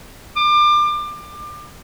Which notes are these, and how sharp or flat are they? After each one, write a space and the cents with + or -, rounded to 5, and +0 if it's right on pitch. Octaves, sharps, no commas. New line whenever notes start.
D6 +30
D6 +25